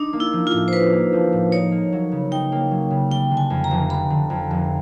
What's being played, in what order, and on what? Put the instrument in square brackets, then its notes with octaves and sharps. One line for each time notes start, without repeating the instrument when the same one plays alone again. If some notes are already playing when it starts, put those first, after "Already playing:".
Already playing: [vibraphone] D4 [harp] D#4
[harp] A#3
[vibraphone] E4
[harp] F3
[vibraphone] F4
[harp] A2
[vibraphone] C5
[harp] D#4 [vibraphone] B4
[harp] A#3
F3
A2
[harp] D#4 [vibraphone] C#5
[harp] A#3
F#3
C#3
[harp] D#4 [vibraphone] G5
[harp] A#3
F#3
C#3
[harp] G3 [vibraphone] G5
[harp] D3
[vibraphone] G#5
[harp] F2
[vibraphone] A#5
[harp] F1
[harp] G3 [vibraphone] B5
[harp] D3
F2
F1